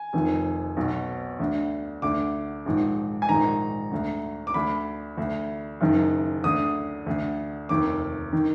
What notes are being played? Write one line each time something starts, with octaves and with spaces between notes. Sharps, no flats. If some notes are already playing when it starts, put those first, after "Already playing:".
Already playing: G#5
F1 F2 D#3
B1 B2
D2 D3
D2 D3 D6
A#1 G#2 D#3
G#5
A#1 G#2 D#3 A#5
D2 D3
D6
D2 D3 B5
D2 D3
F#1 F#2 D#3
D2 D3 D#6
D2 D3
F1 D#2 D#3 D6
D#3